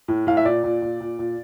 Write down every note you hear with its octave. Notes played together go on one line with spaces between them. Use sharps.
A2
A2 F5
E5
A#2 D5
A#2
A#2
A#2
A#2